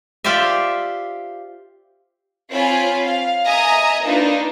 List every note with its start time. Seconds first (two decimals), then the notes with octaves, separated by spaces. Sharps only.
0.24 F4 G4 C5 D5 E5
2.51 C4 F4 C#5 G#5 B5
3.05 F5
3.44 D#5 E5 G#5 A#5 D#6
4.03 A#3 D4 D#4 F4 B4